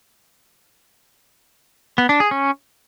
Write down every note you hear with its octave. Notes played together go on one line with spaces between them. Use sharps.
B3
D4
G#4
C#4